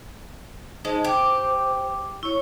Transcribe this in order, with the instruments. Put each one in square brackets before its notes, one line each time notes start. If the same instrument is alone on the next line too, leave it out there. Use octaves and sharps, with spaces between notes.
[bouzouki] G#3 [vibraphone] D#4 A5 [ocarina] C5
[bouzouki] G4 [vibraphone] D6
[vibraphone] E4 C#5 [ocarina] C#6